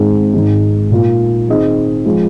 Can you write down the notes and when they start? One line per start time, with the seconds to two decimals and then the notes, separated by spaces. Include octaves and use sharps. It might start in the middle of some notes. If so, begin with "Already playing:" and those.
Already playing: G#1 G#2 G#3 C4 G#4
0.34 G#1 G#2 G#3 D#4
0.91 A#2 A#3 F4
1.48 D#3 C4 G#4 D#5
2.06 F3 G#3 F4